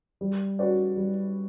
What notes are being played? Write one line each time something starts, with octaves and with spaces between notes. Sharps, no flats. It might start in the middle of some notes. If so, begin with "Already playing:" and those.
G3
C#4 F#4 B4 D5
G3